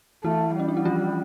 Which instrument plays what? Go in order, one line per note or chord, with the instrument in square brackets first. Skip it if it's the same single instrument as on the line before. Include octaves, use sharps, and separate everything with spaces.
[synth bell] E3 E4 [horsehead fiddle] A3
[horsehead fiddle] G3 [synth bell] C#4
[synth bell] D4
E4
F3 F4